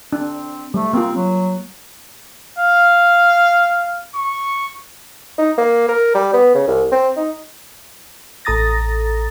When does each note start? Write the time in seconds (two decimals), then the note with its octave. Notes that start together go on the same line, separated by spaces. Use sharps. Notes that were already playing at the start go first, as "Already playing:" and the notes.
0.13 C4 D4
0.74 G3 A3
0.93 A#3 C4 F4
1.16 F#3
2.59 F5
4.15 C#6
5.38 D#4
5.58 A#3
5.89 A#4
6.15 G3
6.33 B3
6.55 C#3
6.67 C2
6.92 C4
7.16 D#4
8.45 A1 A4 A#5 D#6 A6 A#6